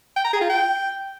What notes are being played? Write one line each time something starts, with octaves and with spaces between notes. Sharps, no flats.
G5
A#5
G#4
F4
G5